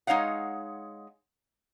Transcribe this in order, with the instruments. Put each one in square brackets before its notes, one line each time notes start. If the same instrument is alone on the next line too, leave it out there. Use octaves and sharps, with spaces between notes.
[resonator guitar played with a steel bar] G#3 D#4 C#5 F5 F#5